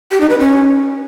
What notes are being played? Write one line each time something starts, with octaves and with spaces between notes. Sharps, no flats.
G4
D#4
B4
C#4